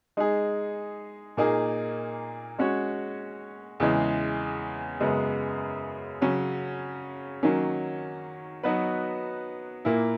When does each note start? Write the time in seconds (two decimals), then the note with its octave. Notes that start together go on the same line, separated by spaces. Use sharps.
0.17 G#3 D#4 G#4
1.37 A#2 A#3 D#4 G#4
2.59 G#3 C#4 F#4 C#5
3.80 E2 C#3 E3 G#3
5.00 F#2 C#3 G#3 B3
6.21 C#3 F#3 C#4
7.43 D#3 F#3 A#3 C#4
8.63 F#3 B3 D#4 F#4 B4
9.85 A#2 A#3 E4